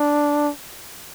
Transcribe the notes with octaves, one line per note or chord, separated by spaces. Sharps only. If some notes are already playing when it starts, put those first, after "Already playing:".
Already playing: D4